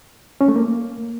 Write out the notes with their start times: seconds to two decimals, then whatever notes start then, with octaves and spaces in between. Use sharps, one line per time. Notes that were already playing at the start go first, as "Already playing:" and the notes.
0.41 C#4
0.48 A3
0.56 A#3